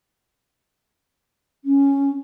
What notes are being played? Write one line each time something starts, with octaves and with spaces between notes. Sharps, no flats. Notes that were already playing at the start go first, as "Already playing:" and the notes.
C#4